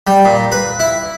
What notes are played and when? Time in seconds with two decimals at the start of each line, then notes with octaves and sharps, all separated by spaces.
0.07 G3
0.25 A#2
0.52 B4
0.80 E4